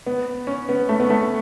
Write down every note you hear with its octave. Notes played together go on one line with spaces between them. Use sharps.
B3
C#4
B3
A3
B3
A3